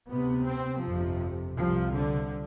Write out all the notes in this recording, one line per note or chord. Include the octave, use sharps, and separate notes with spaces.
D2 C3 B3
C4
G1 F2 C3 F3
C2 C3 F3
D3